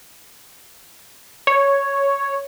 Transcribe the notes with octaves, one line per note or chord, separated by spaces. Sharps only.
C#5